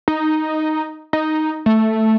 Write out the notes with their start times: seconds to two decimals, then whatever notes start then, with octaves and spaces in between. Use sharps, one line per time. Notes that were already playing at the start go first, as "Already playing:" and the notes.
0.08 D#4
1.13 D#4
1.66 A3